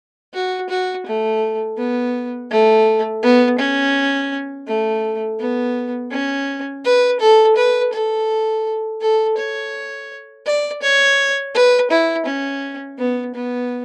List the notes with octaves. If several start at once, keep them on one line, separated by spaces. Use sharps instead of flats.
F#4
F#4
A3
B3
A3
B3
C#4
A3
B3
C#4
B4
A4
B4
A4
A4
C#5
D5
C#5
B4
E4
C#4
B3
B3